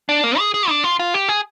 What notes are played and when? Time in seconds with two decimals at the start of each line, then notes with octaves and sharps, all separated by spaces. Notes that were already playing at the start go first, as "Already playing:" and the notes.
0.09 D4
0.24 A#3
0.38 G#4
0.54 G#4
0.69 D4
0.84 F4
0.99 F4
1.14 G4
1.29 G#4